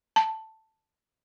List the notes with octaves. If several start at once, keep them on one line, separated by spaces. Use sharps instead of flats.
A5